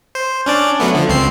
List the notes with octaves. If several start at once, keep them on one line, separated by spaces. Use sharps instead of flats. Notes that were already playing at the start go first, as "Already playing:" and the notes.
C5
C#4 D4 D5
F#3 A3 B3
D3 F3
C#2 C4 C7